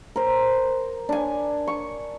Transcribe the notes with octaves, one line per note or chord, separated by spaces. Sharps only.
A#4 C5
D4 G#5
C#6